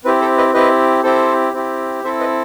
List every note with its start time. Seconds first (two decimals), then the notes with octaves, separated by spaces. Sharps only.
0.05 C4 E4 G4 B4
0.21 A4 C5
0.38 B4 D#5
0.54 C4 E4 G4 B4 D#5
1.03 C4 E4 G4 A4 C5
1.53 C4 E4 G4
2.03 C4 E4 A4 C5 E5
2.20 B4 D#5